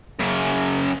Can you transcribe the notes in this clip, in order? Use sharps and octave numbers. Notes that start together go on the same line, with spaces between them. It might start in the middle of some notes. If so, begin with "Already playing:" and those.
F#2 C#3